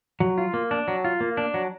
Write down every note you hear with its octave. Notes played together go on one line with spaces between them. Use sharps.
F#3
F4
A#3
D4
F#3
F4
A#3
D4
F#3